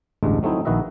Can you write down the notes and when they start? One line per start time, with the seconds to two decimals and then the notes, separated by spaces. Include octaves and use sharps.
0.23 A1 D2 G2 G#3
0.43 F#3 A3 C4 D#4 E4
0.65 A#1 D#3 F#4 B4 D#5 E5